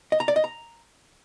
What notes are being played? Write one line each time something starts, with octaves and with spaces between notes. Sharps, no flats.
D#5
A#5
D5
D#5
A#5